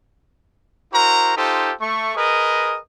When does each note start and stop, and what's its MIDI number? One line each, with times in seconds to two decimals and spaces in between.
0.93 1.36 64
0.93 1.36 66
0.93 1.36 70
0.93 1.36 72
0.93 1.36 82
1.36 1.72 63
1.36 1.72 65
1.36 1.72 67
1.36 1.72 69
1.36 1.72 72
1.80 2.11 57
1.80 2.11 85
2.15 2.78 68
2.15 2.78 70
2.15 2.78 71
2.15 2.78 75